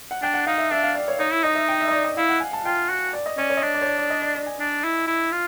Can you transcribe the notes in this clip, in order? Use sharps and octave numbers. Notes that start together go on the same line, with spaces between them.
F#5
D4 G5
F#5
D#4 F5
E5
D4 E5
F5
D5
C#5
D#4 C#5
E4
D#4 D#5
E5
G5
E5
D#5
D5
D#5
E4 F5
F#5
G#5
A5
F4 G5
F#4
D5
D#5
C#4 D5
C#5
D#5
D4 D5
D5
C#5
D5
D5
D#5
D5
D5
G#5
D4
E4
E4
F4